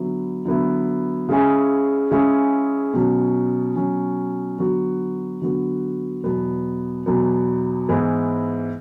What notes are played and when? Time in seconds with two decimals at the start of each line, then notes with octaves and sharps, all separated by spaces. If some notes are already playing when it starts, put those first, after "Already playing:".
Already playing: D3 F#3 B3 E4
0.46 D3 F#3 B3 E4
1.29 C#3 G#3 C#4 E4 G#4
2.11 C#3 G#3 C#4 E4 G#4
2.93 B2 F#3 C#4
3.76 B2 F#3 C#4
4.59 D3 F#3 B3 F#4
5.42 D3 F#3 B3 F#4
6.24 E2 B2 F#3 B3
7.06 E2 B2 F#3 B3
7.89 G#2 E3 B3 E4 G#4